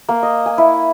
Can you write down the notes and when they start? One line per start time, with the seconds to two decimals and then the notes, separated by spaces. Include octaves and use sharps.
0.09 A#3
0.23 D#5
0.46 G#5
0.58 E4